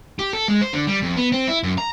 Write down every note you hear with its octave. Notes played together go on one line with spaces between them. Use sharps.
G4
A4
G#3
C5
D3
G3
F2
B3
C4
E4
F#2
A#5